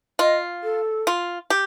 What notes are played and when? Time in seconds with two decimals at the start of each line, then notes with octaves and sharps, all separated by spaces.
0.19 F4 D#5
0.63 A4
1.07 F4
1.50 G4